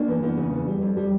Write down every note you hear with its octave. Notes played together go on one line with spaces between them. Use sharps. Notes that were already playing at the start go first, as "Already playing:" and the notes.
Already playing: A#3 D4
E2
E2
C#3
E2
G3
F2
G3